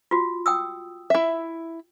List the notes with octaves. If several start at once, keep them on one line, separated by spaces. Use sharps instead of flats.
F4 F#4
G5 D#6 E6
E4 E5